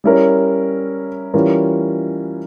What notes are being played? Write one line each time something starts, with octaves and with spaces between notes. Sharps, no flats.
G3 C#4 E4 A#4 C#5
E3 G3 C#4 F4 A#4